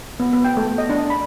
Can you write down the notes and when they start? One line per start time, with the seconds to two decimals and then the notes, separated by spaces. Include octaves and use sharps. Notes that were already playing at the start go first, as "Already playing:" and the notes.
0.20 B3
0.33 B3
0.45 G5
0.57 A3
0.78 D#5
0.90 D4
1.10 B5